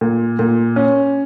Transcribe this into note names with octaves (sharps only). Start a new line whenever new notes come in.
A#2
A#2
C#4